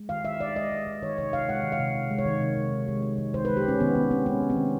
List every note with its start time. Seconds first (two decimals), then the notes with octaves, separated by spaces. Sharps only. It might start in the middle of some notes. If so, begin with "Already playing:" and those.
Already playing: G#3
0.09 D#3 F5
0.25 D#3 E5
0.40 G#3 D5
0.56 G#3 D#5
0.72 D#3
0.87 D#3
1.02 D#3 C#5
1.18 C3 C#5
1.33 C3 F5
1.48 G#3 F#5
1.64 D#3
1.72 F5
1.80 C3
1.95 C3
2.11 G#3
2.18 C#5
2.25 D#3
2.41 C3
2.57 C3
2.72 G#3
2.88 G#3
3.02 G#3
3.18 D#3
3.34 D#3 C5
3.45 B4
3.49 G#3
3.57 G4
3.64 G#3 C#4
3.80 D#3 B3
3.95 D#3 B3
4.10 G#3 C4
4.26 G#3 C#4
4.42 D#3
4.50 C4
4.57 D#3